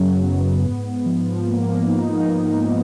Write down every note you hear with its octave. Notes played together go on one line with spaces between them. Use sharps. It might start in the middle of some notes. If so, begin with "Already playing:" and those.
Already playing: F#2 C#3 F#3
B3
G#2
F3
A#3
D#4